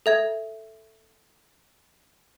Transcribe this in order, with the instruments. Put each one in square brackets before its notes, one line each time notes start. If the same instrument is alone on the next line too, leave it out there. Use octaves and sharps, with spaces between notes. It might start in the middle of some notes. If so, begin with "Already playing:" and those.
[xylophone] A4 E5 G#6